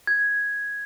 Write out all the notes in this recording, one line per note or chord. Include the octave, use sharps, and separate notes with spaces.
G#6